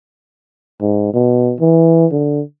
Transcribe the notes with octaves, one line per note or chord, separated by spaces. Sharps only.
G#2
B2
E3
D3